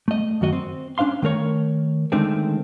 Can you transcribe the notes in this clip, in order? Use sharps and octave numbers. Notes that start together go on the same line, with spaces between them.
A3 D#5
F#2 D#3 F#4 D#5
C4
C#4 D4 C5 F5 C6
D#3 A3 A#4 C#5
D3 D#3 G#3 A3 C4